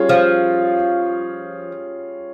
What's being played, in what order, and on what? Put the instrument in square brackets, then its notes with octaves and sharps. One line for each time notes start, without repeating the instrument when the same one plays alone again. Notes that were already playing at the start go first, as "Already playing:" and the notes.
Already playing: [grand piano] G3 C#4 F4 G#4 C#5
[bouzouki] F3